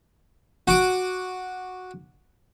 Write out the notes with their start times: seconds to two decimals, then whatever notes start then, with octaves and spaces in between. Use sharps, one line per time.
0.67 F#4 D6